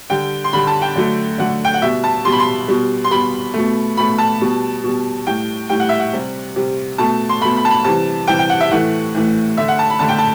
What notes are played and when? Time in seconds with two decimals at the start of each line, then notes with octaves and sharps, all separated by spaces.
0.10 D3 G3 G5
0.44 C6
0.53 D3 G3 B5
0.67 A5
0.82 G5
0.96 D3 F#3 A3
1.38 D3 F#3 A3 F#5
1.65 G5
1.74 F#5
1.82 B2 G3 E5
2.04 A5
2.25 B2 G3 C6
2.32 B5
2.40 C6
2.68 B2 G3
3.04 C6
3.11 B2 G3 B5
3.54 B2 A3
3.97 B2 A3 B5
4.18 A5
4.41 B2 G3
4.83 B2 G3
5.27 A2 G3 G5
5.69 A2 G3 G5
5.80 F#5
5.89 E5
5.99 F#5
6.13 C3 G3
6.56 C3 G3
6.98 B2 A3 A5
7.29 C6
7.41 B2 A3 B5
7.56 B5
7.65 A5
7.70 B5
7.84 C3 E3 G3 A5
8.27 C3 E3 G3 G5
8.39 G5
8.50 F#5
8.60 E5
8.71 A2 E3 A3 F#5
9.15 A2 E3 A3
9.57 D3 A3 E5
9.68 F#5
9.79 A5
9.90 B5
9.99 D3 A3 A5
10.09 G5
10.19 A5